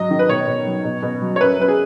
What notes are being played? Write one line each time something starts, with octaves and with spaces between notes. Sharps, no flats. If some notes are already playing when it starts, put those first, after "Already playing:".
Already playing: G#2 F#3 D#5
D#3
B4
B2 C#5
B2
F#3
B2
B2
F#3
C#5
F#2 B4
F#2 B4
G#4